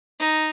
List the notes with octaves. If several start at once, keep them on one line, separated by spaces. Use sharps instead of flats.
D#4